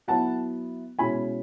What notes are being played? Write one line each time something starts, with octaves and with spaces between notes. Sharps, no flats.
F#3 B3 E4 F#5 A5
B2 G#3 C#4 E4 G#5 B5